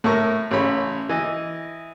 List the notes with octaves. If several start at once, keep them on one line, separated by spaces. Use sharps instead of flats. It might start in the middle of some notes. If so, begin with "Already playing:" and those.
A2 E4 A#4 C#6
A1 C#3 C#5 B5
E3 D#5